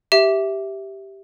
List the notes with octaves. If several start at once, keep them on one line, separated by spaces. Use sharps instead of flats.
G4 E5